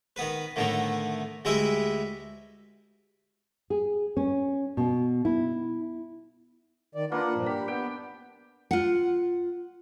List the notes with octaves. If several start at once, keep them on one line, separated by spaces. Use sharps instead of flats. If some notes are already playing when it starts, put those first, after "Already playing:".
D#3 B3 B4
A2 D3 D#3 A3 B3
D2 G3 G#3 E4 B4 E5
G#4
C#4
B2
E4
D#3 D5
A#3 D4 F4 B4 F#5
G2 A#2 F3
G4 B5
B3 G5
F4 F#5